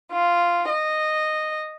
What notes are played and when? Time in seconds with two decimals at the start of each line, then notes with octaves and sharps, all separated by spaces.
0.12 F4
0.69 D#5